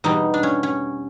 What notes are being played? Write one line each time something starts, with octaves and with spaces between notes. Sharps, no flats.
E2 B2 G3 D#4
D4
C#4
C#4